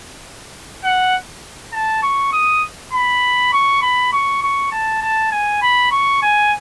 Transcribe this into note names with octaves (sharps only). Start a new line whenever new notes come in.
F#5
A5
C#6
D#6
B5
C#6
B5
C#6
C#6
A5
A5
G#5
B5
C#6
G#5